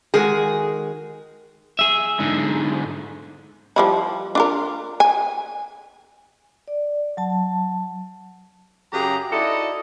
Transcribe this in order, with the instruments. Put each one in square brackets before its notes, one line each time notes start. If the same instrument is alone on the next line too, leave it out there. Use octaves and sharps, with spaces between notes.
[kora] D#3 G#3 F#4 [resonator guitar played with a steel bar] G#4
[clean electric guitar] G#4 E5
[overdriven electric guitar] G#2 D3
[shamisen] F3 G3 E4
D4 F4 A#4
G#5
[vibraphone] D5
F#3 A5
[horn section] F#2 C#3 G4 G#4 G5 A#5
D#4 E4 F#4 A4 D5 D#5